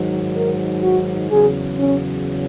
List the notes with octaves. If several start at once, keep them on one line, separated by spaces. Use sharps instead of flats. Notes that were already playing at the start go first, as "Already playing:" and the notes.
Already playing: G#2 D#3 F#3
A#4
F#4
E2 C#3 F#3 G#4
C#4